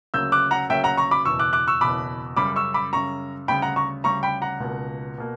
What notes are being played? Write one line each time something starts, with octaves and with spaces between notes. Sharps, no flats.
D2 C#3 F#3 A#3 E6 G6
D6 F#6
F#5 A#5
D2 C#3 F#3 A#3 E5 G5
F#5 A#5
A#5 C#6
B5 D6
F#1 E2 B2 C#6 E6
D6 F#6
D6 F#6
C#6 E6
F#1 E2 B2 B5 D6
F#2 C#3 G3 B5 D6
C#6 E6
B5 D6
F#2 C#3 G3 A#5 C#6
D2 C#3 G3 G5 B5
F#5 A#5
A#5 C#6
D2 C#3 G3 A#5 C#6
G5 B5
F#5 A#5
C#2 B2 A#3
B2 A#3